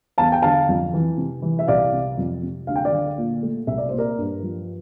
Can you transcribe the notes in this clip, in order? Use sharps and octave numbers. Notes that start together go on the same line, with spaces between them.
E2 F5 A5
G5
D3 F5 A5
F2
E3
C3
E3
E5
C2 D5 F5
C3
F2
C3
D2 F5
G5
D5 F5
D3
A#2
A3
C2 E5
D5
A#2 C5
A#4 D5
G2
F3